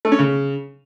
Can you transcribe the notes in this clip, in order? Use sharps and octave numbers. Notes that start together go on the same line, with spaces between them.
A3
C#4
C#3